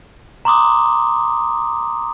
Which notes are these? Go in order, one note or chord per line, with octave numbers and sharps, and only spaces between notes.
A#5 C6 D6 D#6